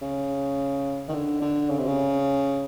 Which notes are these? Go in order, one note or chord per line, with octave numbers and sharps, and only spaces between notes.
C#3
D#3
D3
D3
C#3
C3
C#3